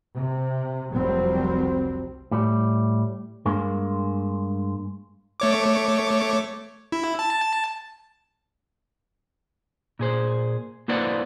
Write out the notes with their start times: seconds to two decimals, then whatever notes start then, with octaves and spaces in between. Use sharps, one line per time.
0.16 C3
0.92 F1 C2 F#3 G3 C4
2.31 A2 G3
3.46 G2 G#3 A#3
5.40 A3 C#5 D6
6.92 E4
7.19 A5
9.99 A#2 G#4 C5
10.88 A#3 E4 B4 C5 D5 F#5